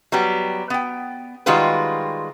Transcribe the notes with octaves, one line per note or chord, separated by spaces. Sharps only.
F#3 G3 B3 G4
B3 G5
D#3 G3 G#3 F4 F#4 B4